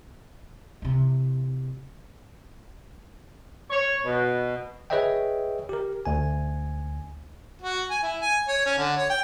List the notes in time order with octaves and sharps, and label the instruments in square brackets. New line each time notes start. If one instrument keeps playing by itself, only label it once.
[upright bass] C3 E3
[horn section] C#5
B2
[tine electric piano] G#4 B4 C#5 D#5 E5 G5
G4 A#4
D2 G#5
[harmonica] F#4
G#5
E4
G#5
C#5
C#4
D3
C#5
G5